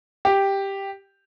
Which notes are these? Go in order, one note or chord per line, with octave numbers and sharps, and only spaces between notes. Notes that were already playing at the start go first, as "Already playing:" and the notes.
G4